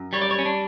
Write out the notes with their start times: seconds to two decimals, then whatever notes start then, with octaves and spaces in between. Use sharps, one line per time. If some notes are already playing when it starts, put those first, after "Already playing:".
Already playing: F#2
0.13 G3 C#5
0.22 D5
0.31 C#5
0.39 C#4
0.45 D4